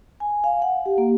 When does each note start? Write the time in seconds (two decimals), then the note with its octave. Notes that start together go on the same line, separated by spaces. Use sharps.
0.20 G#5
0.44 F5
0.62 F#5
0.86 G4
0.98 A#3